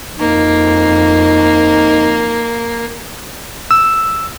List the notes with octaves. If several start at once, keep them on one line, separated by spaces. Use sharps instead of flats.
F2 A#3 D#4
E6